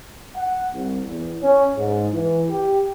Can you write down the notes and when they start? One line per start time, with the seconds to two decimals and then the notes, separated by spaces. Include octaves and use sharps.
0.36 F#5
0.73 C2
1.07 E2
1.42 C#4
1.76 G#2
2.12 E3
2.50 G4